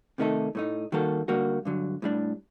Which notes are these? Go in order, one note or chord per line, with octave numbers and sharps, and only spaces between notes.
C3 D#3 A3 D#4 A4
A2 A3 D#4
D#3 G3 A#3 F#4 A4
D3 G3 A#3 F#4
G2 D3 F#3
A2 G3 D4